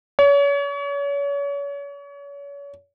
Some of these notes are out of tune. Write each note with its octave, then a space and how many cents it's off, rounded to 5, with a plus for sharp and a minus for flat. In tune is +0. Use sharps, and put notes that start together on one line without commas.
C#5 +35